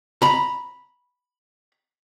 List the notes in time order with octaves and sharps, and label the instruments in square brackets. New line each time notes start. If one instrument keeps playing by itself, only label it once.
[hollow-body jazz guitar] A#5 B5